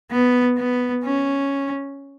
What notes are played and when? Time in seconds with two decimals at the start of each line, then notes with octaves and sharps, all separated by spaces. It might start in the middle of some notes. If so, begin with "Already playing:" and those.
0.11 B3
0.58 B3
1.05 C#4